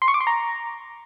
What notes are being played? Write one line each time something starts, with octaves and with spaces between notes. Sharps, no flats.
C6
C#6
D6
C6
A#5